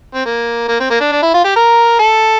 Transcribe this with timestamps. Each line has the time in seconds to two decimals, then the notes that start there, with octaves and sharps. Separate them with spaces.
0.14 C4
0.25 A#3
0.68 A#3
0.80 C4
0.90 A#3
1.01 D4
1.12 D4
1.22 E4
1.34 F4
1.45 G4
1.56 A#4
1.99 A4